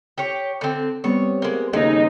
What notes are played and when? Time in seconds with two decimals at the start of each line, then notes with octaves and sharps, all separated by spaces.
0.18 G4 C#5
0.61 D3 C4
1.04 G3 B3 C4 C#5
1.42 G#3 A#3
1.73 D#2 C#3 G#3 D#4